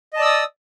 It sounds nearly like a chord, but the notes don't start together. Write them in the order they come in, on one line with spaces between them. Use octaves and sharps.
D#5 A5 D5 E6 D#6